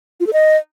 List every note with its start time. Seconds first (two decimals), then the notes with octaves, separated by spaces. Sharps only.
0.20 F4
0.27 A4
0.33 D#5